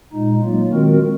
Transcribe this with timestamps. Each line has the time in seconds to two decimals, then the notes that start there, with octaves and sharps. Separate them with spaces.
0.13 A#2 G#3 D#4
0.42 F#3 A#3 F4
0.70 D#3 G#3 C4 F#4 A#4